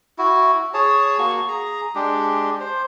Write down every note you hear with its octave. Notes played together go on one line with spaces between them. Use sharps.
E4 F#4
G#4 C#5 A5
A#3 F#4 C#6
G#4 A#5
G#3 D4 G4
C5